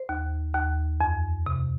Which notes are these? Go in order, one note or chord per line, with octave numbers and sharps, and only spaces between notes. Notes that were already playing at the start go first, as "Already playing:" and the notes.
Already playing: C5
D#2
D#2
F2
C3